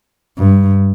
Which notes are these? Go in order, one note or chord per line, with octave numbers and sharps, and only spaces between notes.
G2